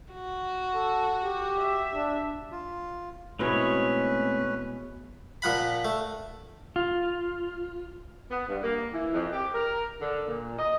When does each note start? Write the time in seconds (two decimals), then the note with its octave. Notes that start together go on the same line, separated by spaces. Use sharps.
0.13 F#4
0.75 A4
1.24 G4
1.60 E5
1.95 D4
2.52 F4
3.39 B2 G#3 A3 C4 C#4 E4 B4 C#5
5.42 A#2 F3 F#5 B5
5.85 A3
6.76 F4
8.31 B3
8.48 G2
8.63 A#3
8.93 E3
9.13 F2
9.33 G4
9.55 A#4
10.00 D3
10.28 A#2
10.59 D#5